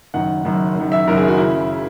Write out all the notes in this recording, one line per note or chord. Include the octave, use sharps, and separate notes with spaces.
F#1 F#2 D#3 F#5
F#1 F#2 D#3
F#1 F#2 D#3
E5
F#1 F#2 D#3 A#4
G#4
F#4
C#3 E4